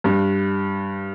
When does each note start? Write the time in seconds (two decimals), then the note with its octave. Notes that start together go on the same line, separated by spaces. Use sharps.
0.04 G2